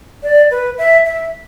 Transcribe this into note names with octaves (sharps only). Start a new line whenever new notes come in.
D5
B4
E5
E5